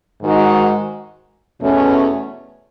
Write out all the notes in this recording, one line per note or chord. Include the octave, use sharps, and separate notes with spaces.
G#2 D#3 G#3 D#4 F#4
E2 B2 A3 C#4